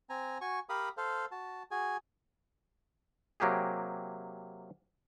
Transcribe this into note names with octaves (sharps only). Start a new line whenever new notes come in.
C4 G#5 A#5
F#4 G#5 C#6
G4 A#4 F5 B5 D#6
A4 C5 F5
F#4 A5
F#4 G#4 G#5
C3 F#3 A#3 G4 G#4